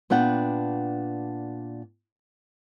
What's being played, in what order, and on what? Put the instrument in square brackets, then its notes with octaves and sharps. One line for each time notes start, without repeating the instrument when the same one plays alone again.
[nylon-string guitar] A#2 B3 D4 F#5 G5